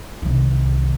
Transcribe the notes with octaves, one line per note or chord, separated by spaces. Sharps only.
C2 D#3